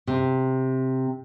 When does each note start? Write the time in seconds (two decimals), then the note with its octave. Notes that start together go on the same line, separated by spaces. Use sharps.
0.07 C3